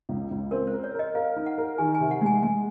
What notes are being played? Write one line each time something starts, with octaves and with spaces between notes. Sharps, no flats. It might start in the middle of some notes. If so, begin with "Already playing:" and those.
C#2
C#2
C4 A#4
C5
A#4
C#5
A#4 D#5
A#4 F5
D#4
F#5
A#4
D#3 G#5
G#5
C3
F#5
G#3 G#5
G#3 G#5